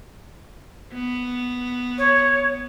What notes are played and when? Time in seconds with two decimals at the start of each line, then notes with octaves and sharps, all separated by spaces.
0.94 B3
1.98 C#5